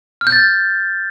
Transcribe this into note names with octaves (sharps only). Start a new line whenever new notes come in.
F6
G6
A6